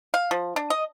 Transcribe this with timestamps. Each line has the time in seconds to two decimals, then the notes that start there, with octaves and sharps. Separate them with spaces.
0.14 F5
0.31 F3
0.56 D4
0.70 D#5